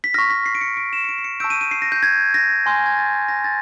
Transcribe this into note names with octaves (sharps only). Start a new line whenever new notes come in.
B6
C#6 F6 A#6
B6
C7
D7
C#7
D7
E7
C#7
D7
C7
C#7
A5 C#6 E6 G6 D7
D#7
D#7
C7
A#6
G6
G#6
A#6
G#5 C6 F6
G#6
A6
A#6
A6